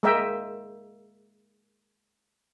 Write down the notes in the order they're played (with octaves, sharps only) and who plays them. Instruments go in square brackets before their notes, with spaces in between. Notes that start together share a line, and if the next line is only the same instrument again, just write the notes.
[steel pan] G#3 A#3 A#4 D#5 E5 G5